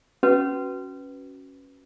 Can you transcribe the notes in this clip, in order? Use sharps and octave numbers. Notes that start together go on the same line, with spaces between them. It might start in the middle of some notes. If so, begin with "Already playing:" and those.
C#4 F#4 B4